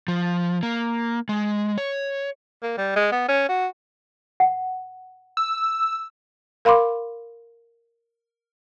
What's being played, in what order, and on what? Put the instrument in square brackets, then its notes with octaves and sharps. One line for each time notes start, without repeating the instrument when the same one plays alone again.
[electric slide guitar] F3
A#3
G#3
C#5
[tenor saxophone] A#3
G3
G#3
B3
C#4
F#4
[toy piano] F#5
[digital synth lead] E6
[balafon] A#4 F5 B5 C6 D6